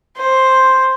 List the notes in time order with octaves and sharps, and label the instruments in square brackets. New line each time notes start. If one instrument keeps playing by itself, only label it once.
[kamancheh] C5